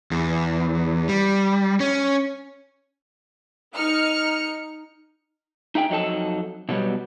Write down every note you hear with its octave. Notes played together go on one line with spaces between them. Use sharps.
E2
G3
C#4
D#4 F6 C#7
D#4 E4 G#4 G5
F2 F#3 D#4 A4 A5
B2 D3 F#3 G3 B3